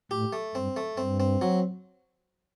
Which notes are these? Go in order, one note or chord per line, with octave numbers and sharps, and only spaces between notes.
A2 G4
A3
G2 C4
A3
G2 C4
C4
F#3